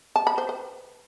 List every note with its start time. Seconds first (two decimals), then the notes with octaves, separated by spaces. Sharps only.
0.16 A5
0.27 B5
0.38 C5
0.49 B4